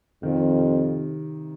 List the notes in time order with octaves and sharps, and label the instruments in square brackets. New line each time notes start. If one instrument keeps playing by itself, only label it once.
[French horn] F2 [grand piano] D#3
[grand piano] C3